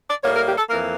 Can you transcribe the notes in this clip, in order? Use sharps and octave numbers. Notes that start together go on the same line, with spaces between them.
D5
A2 G3 A#3 C#5
A#4
G4
A4
F2 E3 A#3 A#4